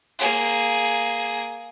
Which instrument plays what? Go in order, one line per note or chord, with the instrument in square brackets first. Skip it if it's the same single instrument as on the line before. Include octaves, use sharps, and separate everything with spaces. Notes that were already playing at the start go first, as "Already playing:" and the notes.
[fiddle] A#3 G#4